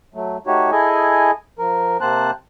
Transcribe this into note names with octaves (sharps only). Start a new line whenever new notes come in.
F#3 A3
A3 D#4 F#4 G4 C#5
E4 G#4 A4 D#5 G#5
F3 A#4
C3 A#3 C4 C5 A5 F#6